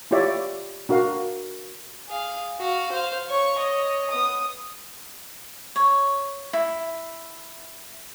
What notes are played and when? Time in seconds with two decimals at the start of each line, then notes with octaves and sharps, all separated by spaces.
0.11 E4 F4 G4 C#5 D5 E5
0.89 D4 F#4 A#4 F5
2.08 G#4 F5
2.59 F#4 F5
2.92 C5 F5
3.28 C#5 C#6
3.59 C#5 D#5
4.11 B3 D#6
5.76 C#5
6.53 E4